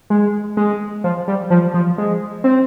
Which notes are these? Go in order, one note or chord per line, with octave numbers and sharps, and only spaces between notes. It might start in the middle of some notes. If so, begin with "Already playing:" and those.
G#3
G#3
F3
G3
F3
F3
G#3
C4